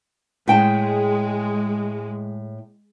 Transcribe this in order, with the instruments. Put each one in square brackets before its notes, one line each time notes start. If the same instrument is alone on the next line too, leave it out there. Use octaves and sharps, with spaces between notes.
[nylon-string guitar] A2 G5 A5 [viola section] G#3